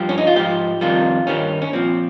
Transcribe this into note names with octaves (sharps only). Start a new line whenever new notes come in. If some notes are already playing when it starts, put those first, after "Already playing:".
Already playing: G2 F3 G4
C#4
D#4
F4
G#2 F3 G4
F2 C3 D#3 G3 F4
G2 D#3 G3 C#4
C#4
A#2 F3 C4